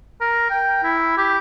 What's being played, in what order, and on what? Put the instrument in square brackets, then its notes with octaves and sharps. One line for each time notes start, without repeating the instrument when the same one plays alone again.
[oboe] A#4
G5
E4
G4